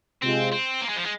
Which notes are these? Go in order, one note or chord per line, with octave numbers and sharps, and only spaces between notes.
C3 G#3 C4 F4
C4
A#3
G#3
F3
G#3